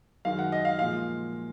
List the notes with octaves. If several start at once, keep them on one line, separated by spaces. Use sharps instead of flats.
F#2 D#3 G#3 F5
F#5
D#5
F5
A#2 F3 G#3 F5